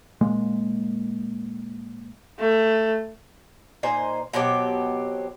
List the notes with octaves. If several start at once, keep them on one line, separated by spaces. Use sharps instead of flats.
A#2 G#3 A#3
A3
A#2 D#4 C5 G#5
B2 F#3 C4 G4